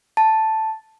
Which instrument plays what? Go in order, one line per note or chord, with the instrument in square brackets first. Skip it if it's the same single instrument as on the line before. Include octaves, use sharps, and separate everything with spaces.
[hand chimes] A5